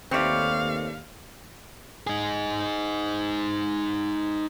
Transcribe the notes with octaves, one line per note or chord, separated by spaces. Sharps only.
D#2 A3 C4 B4 C#5 D5 F5
D#4 G#4